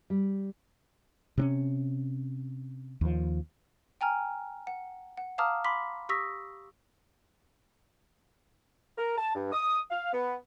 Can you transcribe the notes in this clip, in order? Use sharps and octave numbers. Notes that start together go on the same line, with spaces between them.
G3
C3 C4 C#4
D#2 F3
G5 G#5 A#5 F6
F#5
F#5
F5 A5 A#5 D6 D#6 F6
B5 C6 D6 B6
G4 C#6 D#6 E6 A#6 B6
A#4
A5
G2
D#6
F5
B3